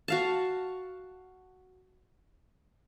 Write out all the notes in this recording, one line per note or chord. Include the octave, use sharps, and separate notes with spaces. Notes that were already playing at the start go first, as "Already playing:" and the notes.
F#4 F5 A5